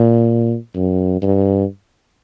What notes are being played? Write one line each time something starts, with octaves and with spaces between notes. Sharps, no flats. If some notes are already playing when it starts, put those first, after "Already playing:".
Already playing: A#2
F#2
G2